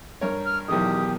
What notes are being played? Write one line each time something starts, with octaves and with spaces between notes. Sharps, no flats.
G2 A#4 C#5
F6
B1 E2 D#3 G4 D#6